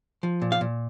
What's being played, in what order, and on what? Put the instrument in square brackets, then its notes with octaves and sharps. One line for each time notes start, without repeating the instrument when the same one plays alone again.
[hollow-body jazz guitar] F3
A#2
F5
A#2